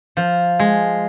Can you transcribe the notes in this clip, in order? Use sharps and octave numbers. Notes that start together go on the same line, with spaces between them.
F3
G#3